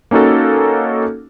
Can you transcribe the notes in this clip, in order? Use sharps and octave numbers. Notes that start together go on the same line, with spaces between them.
A#3 C#4 D#4 F#4 A4